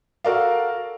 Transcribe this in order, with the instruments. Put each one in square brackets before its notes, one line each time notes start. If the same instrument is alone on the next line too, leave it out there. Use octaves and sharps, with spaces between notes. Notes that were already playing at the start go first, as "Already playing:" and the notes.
[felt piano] F#4 A4 A#4 D5 F5